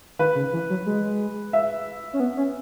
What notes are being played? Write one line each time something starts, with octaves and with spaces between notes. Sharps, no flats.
D#3 B4
C#3
E3
F#3
G#3
E5
C#4
B3
C#4